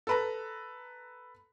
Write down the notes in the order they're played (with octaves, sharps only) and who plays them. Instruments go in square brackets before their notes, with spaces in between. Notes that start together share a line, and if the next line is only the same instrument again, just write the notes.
[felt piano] A4 B4 A#5